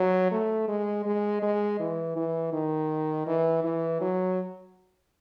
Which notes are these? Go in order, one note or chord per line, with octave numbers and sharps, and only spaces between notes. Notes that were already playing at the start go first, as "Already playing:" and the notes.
Already playing: F#3
A3
G#3
G#3
G#3
E3
E3
D#3
E3
E3
F#3